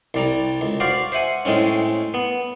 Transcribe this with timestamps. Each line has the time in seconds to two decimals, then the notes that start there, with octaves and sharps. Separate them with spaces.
0.14 C2 G3 A#5
0.61 C#2
0.80 F#4 C5 D5 F5
1.12 C5 E5 F#5 G#5
1.45 A2 G#3 C4 C#4
2.14 B3